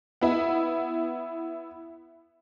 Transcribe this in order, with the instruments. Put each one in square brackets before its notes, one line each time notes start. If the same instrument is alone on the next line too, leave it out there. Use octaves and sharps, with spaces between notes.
[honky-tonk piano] B3 E4